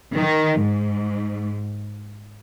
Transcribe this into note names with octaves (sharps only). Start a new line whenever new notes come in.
D#3
G#2